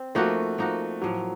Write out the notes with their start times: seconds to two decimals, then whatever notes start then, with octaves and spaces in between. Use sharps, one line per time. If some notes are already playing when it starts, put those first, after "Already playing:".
Already playing: C4
0.15 F3 A3 A#3 D#4 F#4
0.58 F3 A#3 D#4 F#4
1.01 A2 F3 F#3 A#3